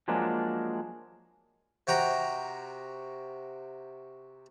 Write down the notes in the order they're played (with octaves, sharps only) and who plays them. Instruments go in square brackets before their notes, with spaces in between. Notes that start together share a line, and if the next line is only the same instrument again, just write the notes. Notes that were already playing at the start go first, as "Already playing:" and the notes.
[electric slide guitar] F3 F#3 G#3 A#3 D4
[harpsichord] C3 F#4 G5 A#5